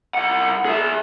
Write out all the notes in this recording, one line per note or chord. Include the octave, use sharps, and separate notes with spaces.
C2 F#5
G#4 E5